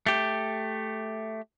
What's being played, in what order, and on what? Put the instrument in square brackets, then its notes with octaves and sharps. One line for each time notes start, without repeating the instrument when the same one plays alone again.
[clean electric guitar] A3 G4